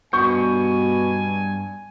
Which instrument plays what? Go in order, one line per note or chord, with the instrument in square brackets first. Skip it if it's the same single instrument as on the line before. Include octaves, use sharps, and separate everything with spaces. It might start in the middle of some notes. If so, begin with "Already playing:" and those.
[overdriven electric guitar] G2 [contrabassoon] B2 [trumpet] G#5 [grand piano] C#6 G6